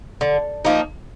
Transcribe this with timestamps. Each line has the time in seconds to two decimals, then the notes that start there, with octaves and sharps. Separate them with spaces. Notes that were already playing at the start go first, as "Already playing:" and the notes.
0.21 D3
0.65 F3 A#3 D#4